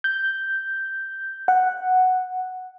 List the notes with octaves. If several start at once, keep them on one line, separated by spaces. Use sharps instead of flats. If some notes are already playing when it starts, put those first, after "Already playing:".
G6
F#5